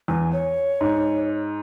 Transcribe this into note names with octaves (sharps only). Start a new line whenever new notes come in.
E2 G#5
C#5
G#2